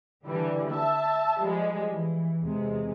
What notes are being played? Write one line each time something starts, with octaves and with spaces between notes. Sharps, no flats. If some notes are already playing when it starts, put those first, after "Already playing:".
D3 E3 G3
E5 A5
F3 G3 G#3
E3
E2 C3 G#3